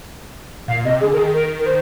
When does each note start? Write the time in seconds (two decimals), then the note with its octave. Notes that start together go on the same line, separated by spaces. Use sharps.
0.68 A#2 F5
0.85 C3 D#5
1.01 D3 G#4
1.12 D3 A#4
1.17 D#3 G#4
1.33 A#4
1.59 A#4
1.66 C5